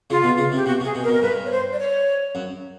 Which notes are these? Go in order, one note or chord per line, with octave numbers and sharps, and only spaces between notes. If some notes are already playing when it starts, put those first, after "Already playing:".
C#3 F4
B2
C#3
C3
G4
B2 F#4
C3
G#4
B2
A#4
B2
A#4
G2 B4
C#5
C5
D5
C#5
F#2